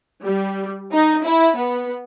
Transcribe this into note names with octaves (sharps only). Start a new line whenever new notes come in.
G3
D#4
E4
B3